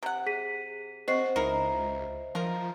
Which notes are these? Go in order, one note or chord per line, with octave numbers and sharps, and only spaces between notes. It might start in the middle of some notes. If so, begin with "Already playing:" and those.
C3 F#5
G#4 B6 D#7
C4 F#4 C5 D#5 C7
C#2 D#4 E4 A#4
F3 F4 A#4